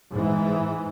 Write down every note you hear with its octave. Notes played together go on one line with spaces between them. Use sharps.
G#2 E3